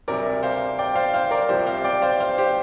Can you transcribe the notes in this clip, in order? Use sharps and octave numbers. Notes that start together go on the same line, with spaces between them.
D2 C3 G3 A#4 D5
C5 F5
D5 G5
C5 F5
C5 F5
A#4 D5
C2 C3 F3 G4 C5
C5 F5
D5 G5
C5 F5
C5 F5
G4 C5